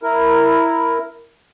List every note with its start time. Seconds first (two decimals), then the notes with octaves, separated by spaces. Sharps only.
0.03 E4 A#4